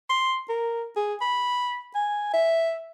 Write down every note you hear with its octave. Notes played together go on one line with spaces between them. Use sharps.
C6
A#4
G#4
B5
G#5
E5